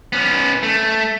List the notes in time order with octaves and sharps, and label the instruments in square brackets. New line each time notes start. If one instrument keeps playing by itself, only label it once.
[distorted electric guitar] B3 C#4
A3